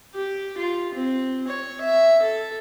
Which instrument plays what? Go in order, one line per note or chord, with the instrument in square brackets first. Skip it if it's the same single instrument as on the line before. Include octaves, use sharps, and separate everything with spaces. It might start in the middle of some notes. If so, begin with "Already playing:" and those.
[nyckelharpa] G4
F4
C4
C#5
E5
A4